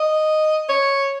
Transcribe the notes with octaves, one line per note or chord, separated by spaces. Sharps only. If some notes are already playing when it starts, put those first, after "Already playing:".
Already playing: D#5
C#5